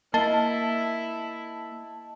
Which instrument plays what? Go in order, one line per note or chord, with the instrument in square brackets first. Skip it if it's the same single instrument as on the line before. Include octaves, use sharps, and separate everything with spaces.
[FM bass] A#3 [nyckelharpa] E4 E5 [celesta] D#5 G7 [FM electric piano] A5